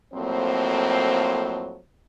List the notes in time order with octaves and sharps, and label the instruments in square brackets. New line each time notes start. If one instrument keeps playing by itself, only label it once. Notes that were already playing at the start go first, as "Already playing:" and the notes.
[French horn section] F2 A2 F#3 A#3 C4 C5